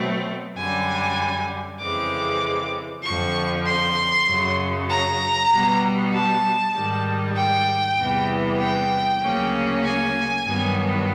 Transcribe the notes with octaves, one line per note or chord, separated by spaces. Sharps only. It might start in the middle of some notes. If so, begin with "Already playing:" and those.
Already playing: B2 F#3 A3 C4
F#2 D3 G3 G#5
F2 C#3 E3 G#3 C4 D6
F2 D3 F3 C#6
C6
F#2 C#3 F#3
A#5
B2 G3 B3
A5
G#2 D#3 G3
G5
E2 C3 E3 G3 B3
G5
D2 C#3 F#3 A#3 C#4
G#5
G2 D#3 F#3 B3